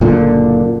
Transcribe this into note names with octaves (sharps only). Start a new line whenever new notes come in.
F#1 A#2 D3